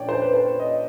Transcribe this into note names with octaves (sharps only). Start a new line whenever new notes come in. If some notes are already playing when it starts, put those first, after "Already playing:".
Already playing: A#2 F3 A#3 D4 C#5 D5 G5
C5
B4
C5
C#5
D#5